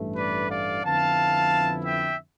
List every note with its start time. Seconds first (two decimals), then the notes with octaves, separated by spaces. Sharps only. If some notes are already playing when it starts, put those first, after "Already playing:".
Already playing: A1 G2 E3 A3
0.16 B4 D5
0.49 D5 F5
0.83 F2 D3 F3 B3 E4 F5 A5
1.84 E5 G5